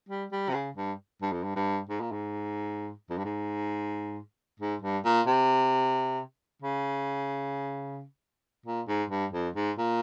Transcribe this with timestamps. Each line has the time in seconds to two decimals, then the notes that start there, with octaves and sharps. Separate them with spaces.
0.09 G3
0.32 G3
0.49 C3
0.54 C#3
0.76 G2
1.22 G2
1.32 F2
1.43 G2
1.56 G2
1.89 G#2
2.01 A#2
2.12 G#2
3.10 F2
3.18 G2
3.24 G#2
4.60 G#2
4.82 G2
5.05 A#2
5.27 C3
6.62 C#3
8.66 A#2
8.88 G#2
9.10 G2
9.33 F2
9.55 G#2
9.78 A#2